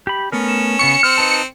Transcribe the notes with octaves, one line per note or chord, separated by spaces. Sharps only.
G4 B5
A3 B3 C#4 A#4
E7
C#3 B3 C#6 C#7
C4 F6
D#4 B4 A5